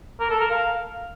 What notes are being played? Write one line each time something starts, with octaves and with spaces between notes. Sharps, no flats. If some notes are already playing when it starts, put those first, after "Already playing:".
A#4
A4
A#4
F5